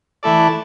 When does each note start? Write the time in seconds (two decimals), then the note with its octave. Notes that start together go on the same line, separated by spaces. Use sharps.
0.23 E3 A3 E4 A4 D5